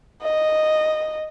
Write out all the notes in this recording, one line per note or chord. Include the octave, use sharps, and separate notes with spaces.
D#5